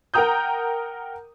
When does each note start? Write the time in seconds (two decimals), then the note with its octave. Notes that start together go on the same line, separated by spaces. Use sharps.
0.14 A#4 F#5 G5 A#5 D#6 G6